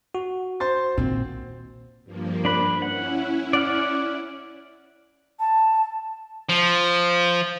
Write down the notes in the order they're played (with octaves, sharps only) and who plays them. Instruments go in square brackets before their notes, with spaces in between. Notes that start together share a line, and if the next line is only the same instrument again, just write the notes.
[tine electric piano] F#4
[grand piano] C5 C6 A6
[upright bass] A#2 D#3 [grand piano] C4
[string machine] G2 F3 A#3
[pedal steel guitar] D4 B5 F#6
[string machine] C#4 E4 [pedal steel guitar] F#5
[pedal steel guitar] D5 F#5 F6
[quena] A5
[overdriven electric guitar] F3